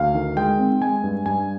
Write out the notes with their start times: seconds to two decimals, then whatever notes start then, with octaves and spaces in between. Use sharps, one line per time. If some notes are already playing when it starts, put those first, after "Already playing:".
Already playing: D2 F5
0.15 D#3
0.37 G#3 G5
0.59 C4
0.81 G#3 G#5
1.04 G2
1.26 G2 G#5